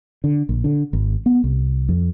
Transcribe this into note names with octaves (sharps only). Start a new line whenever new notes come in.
D3
A#1
D3
G#1
B3
C2
F2